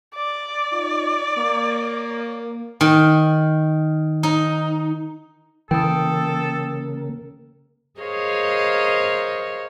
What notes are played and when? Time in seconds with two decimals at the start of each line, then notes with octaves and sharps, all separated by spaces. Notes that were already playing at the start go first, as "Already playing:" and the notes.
0.15 D5
0.72 D#4 F4
1.38 A#3
2.81 D#3
4.23 D#4
5.71 C#3 E3 A#3 A4 G5 D#6
8.01 G#4 A#4 C5 C#5 D#5 F5